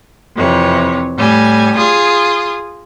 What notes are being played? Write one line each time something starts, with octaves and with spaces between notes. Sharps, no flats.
F2 C3 E3 C#5
A2 G3 G#5
F4 G#4 D#6